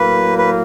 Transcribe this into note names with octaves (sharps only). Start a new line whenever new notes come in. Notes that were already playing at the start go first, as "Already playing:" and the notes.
Already playing: A2 F#3 A#3 B4
B4